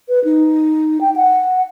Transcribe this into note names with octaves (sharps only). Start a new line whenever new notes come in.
B4
D#4
G5
F#5